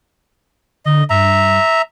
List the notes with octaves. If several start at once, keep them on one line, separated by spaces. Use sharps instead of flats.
D3 D#5
G2 E5 A#5